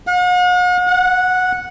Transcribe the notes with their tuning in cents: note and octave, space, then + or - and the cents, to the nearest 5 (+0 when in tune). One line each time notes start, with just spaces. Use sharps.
F#5 -45
F#5 -10